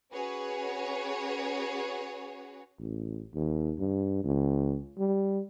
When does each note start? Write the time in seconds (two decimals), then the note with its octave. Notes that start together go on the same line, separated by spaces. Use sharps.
0.12 C#4 F#4 G#4 B4 C#5
2.79 A1
3.34 D#2
3.79 G2
4.24 C#2
4.99 G3